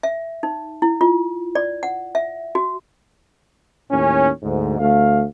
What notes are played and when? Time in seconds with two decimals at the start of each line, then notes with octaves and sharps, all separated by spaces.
0.03 E5
0.43 D#4
0.82 E4
1.01 F4
1.55 D5
1.83 F#5
2.15 E5
2.55 F#4
3.91 D#2 A2 C#4
4.43 D2 G#2
4.79 D2 A3 F5